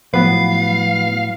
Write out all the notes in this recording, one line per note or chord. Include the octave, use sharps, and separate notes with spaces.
A2 F3 F#3 B3 B4 F5